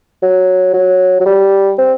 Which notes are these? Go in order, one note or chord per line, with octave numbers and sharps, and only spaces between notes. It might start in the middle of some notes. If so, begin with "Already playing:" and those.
F#3
F#3
F#3
G3
C4